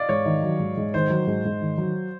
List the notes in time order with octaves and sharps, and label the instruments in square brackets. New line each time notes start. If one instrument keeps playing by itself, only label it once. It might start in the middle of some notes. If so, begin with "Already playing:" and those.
Already playing: [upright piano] D5 D#5 F5
[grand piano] G#2 [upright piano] C#5
[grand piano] D#3
F#3
G#2
G#2
[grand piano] D#3 [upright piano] C5
[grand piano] F#3
G#2
G#2
D#3
F#3